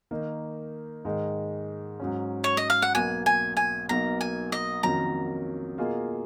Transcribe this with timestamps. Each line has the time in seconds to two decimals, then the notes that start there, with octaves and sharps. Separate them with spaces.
0.11 D#3 A#3 D#4
1.05 G#2 D#3 G#3 D#4
2.00 G#2 F#3 C#4
2.44 C#5
2.57 D#5
2.70 F5
2.82 F#5
2.95 B1 B2 A#3 G#5
3.26 G#5
3.57 G#5
3.89 B1 B2 A#3 D#4 A#4 A#5
4.21 G#5
4.52 D#5
4.83 F2 D#3 F#3 A#3 C#4 A#5
5.78 B2 A#3 F4 G#4 D#5